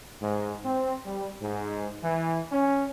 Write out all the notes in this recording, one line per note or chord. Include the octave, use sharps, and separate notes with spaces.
G#2
C4
G3
G#2
E3
C#4